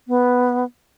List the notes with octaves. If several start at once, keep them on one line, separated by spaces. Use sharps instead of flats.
B3